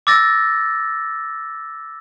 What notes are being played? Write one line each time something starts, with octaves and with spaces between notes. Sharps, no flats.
D6 E6 A6 A#6